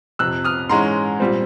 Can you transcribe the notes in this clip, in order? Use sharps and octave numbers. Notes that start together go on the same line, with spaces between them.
F2 C3 F3 E6 F#6
D#6 F6
G#2 E3 G#3 C#4 A#5 C6
A#2 G3 C4